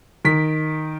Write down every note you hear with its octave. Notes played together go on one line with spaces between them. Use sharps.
D#3 B6